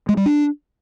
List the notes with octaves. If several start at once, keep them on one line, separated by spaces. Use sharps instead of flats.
G#3
G3
D4